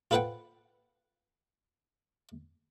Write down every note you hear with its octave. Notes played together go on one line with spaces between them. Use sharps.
F4 A4 B4 C5 F#5 G5